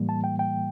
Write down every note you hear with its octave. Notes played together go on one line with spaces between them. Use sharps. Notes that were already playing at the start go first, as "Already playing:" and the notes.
Already playing: A2 E3 G3 A#3
A5
G5
G5